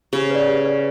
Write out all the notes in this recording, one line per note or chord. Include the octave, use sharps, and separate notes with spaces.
C#3 G4
B4 D5
G4
B4 D5